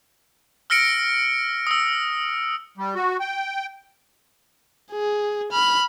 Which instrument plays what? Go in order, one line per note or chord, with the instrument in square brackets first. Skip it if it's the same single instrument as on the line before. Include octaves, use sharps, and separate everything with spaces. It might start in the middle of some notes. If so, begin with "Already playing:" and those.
[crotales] E6 F6 A#6 C#7 D7
D#6 E6
[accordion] G3
F#4
G5
[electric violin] G#4
B5 F6